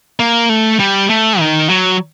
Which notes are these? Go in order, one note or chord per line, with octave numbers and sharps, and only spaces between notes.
A#3
A3
G3
A3
D#3
F#3